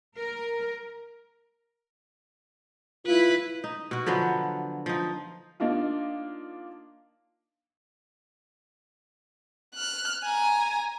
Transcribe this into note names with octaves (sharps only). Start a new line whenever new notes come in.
A#4
E4 F4 B4
D#4
B2 F#4
D3 F3 F#3 B3
F3 D#4
A#3 D4 D#4 F4
F6 F#6
G#5 A#5